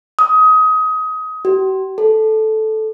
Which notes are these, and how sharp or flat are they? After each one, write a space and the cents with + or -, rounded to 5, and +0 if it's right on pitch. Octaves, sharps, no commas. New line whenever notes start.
D#6 +25
G4 -45
A4 -10